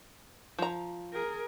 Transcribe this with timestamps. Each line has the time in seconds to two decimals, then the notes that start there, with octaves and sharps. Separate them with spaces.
0.59 F3 A#5
1.13 G#4 A#4